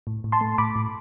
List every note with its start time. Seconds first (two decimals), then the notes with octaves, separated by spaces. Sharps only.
0.07 A2
0.24 A2
0.32 A5 C6
0.41 A3
0.58 A2 B5 D6
0.76 A2